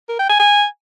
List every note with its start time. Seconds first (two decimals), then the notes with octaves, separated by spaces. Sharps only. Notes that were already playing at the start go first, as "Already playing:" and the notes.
0.09 A#4
0.19 G5
0.29 G#5
0.39 G#5